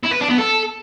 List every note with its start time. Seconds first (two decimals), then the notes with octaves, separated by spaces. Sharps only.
0.04 E4
0.12 B4
0.21 D4
0.30 B3
0.38 A4